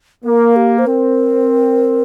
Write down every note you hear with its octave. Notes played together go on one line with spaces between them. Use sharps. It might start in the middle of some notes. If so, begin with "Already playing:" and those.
A#3 A#4
G4
C5
C4 A#4